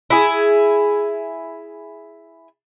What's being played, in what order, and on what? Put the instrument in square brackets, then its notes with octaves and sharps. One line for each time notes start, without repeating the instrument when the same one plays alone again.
[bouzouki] E4 G#4